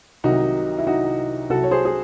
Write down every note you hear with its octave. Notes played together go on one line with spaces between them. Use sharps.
C2 C3 D#3 F#3 D#4 F#4
E4
D#4 F#4
C2 C3 F#3 F#4 A4
C#5
G#4 C5
G#4